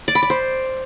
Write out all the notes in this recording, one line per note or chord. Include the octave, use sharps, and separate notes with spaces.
D5
B5
D5
C5